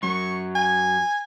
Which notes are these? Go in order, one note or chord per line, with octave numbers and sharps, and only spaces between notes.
F#2 F#3 C#6
G#5